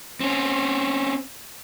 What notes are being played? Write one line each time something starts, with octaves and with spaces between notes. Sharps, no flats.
C4 C#4